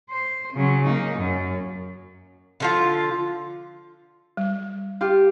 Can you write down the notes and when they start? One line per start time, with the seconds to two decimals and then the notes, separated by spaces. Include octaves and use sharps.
0.10 C5
0.53 C#3 F#3
0.86 A#3 D#4
1.16 F#2
2.60 D3 F3 F4
4.37 G3
5.01 F4 G4